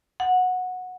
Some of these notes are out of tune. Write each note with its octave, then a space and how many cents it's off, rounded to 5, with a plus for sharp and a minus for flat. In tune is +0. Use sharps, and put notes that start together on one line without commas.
F#5 -15